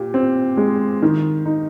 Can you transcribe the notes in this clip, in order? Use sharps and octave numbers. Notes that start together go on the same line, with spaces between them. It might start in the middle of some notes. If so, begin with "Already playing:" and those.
Already playing: A#2 G4
C4
G#3
D#3
D#4